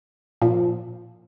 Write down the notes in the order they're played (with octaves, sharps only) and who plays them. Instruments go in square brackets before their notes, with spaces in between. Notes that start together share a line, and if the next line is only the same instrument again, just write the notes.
[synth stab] A#2 F3